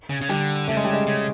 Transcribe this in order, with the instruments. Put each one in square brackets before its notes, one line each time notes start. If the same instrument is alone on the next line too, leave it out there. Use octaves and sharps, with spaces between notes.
[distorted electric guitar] C#3
C#3
[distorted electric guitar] D3 [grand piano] G3
[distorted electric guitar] C#3 [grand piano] A3
[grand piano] G#3
G3
G#3
[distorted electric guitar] C#3